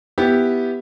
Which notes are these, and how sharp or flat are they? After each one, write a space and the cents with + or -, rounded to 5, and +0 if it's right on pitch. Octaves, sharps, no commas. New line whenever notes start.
B3 +0 E4 +0 G4 +0